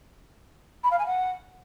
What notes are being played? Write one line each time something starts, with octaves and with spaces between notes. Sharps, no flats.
B5
F5
G#5
F#5